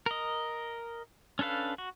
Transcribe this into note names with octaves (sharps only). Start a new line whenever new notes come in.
A#4 D#5
C#4 D4 A4 B4 F5
F#4